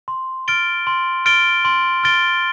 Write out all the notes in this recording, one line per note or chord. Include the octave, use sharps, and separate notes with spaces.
C6
F6 A6 D7 G7
C6
F6 A6 D7 G7
C6
F6 A6 D7 G7